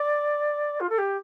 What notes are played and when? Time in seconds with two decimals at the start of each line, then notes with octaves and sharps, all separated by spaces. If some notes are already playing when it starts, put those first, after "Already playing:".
Already playing: D5
0.80 F4
0.89 A4
0.98 G4